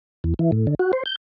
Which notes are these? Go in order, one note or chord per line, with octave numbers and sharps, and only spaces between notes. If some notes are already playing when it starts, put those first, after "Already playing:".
E2
E3
A2
D3
F#4
C5
G6